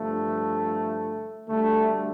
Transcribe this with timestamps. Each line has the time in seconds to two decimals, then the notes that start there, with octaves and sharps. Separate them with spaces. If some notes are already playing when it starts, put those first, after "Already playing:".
Already playing: G2 D3 F3 A3
1.48 D2 D3 G3 A3